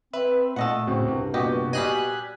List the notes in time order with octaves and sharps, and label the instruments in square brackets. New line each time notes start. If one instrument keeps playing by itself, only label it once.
[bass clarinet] C4 [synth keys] B4 [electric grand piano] E5
[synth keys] A#2 [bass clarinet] A3 [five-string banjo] A4 D#5 F#5
[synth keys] A2 C#3 [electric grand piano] C4 F#4
[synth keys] C2 C3 [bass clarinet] G2
[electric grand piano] A#2 B3 F#4 [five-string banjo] G4 D#5
[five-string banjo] G3 G#4 D#5 [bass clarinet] G4 [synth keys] G#5 F#6 B6